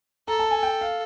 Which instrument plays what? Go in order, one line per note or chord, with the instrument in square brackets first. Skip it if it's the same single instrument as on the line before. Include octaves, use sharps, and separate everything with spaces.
[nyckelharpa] A4 [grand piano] A#5
[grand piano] A5
G#5
G5
F5